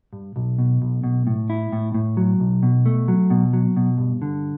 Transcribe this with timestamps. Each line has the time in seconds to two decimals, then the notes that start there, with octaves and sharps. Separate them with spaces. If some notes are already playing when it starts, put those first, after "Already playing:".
0.13 G2
0.36 B1
0.58 B2
0.82 B1
1.04 B2
1.27 A2
1.50 E4
1.73 A2
1.94 A2
2.17 F#3
2.40 B1
2.63 B2
2.86 A3
3.08 F#3
3.30 B2
3.53 F#3
3.77 B2
3.98 G2
4.22 D3